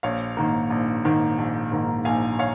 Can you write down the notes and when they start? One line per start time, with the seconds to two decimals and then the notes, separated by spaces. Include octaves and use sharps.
0.03 A#1 C#5 F5
0.37 G#2 D#3 A#3
0.70 A#1
1.04 G#2 D#3 A#3
1.38 A#1
1.71 G#2 D#3 A#3
2.05 A#1 F5 G#5
2.39 C#5 F5